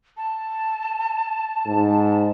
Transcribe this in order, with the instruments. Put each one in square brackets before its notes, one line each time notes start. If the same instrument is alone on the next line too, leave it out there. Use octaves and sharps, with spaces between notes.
[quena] A5
[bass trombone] G#2